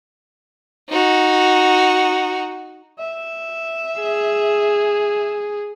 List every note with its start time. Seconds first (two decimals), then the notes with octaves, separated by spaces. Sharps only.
0.90 D#4 F#4
2.99 E5
4.01 G#4